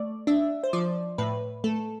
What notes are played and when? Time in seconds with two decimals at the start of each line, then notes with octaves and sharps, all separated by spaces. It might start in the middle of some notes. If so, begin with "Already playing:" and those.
Already playing: A3 D5
0.27 D4 E5
0.64 C5
0.73 F3 D5
1.18 A2 B4
1.64 A3 A4